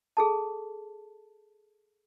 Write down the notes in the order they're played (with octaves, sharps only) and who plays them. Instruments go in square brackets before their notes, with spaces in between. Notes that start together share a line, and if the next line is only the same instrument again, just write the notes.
[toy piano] G#4 A4 A5